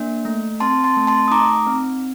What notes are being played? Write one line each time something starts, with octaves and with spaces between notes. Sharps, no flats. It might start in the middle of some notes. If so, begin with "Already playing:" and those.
Already playing: A#3 D4
A3
C4 A5 C6
A5 C6
A3
A5 C6
D#6
D#4 A#5 D6
C4